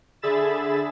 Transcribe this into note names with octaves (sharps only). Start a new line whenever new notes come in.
D3 G#4 E5 B5 A6 E7